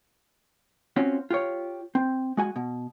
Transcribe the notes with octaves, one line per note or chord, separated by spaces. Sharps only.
C4 C#4 F4 F#4
F4 G4 C#5
C4
G#3 F#4 G#5
B2